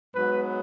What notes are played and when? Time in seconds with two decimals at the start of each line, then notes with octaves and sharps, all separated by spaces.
0.13 G#2 F#3 B3 B4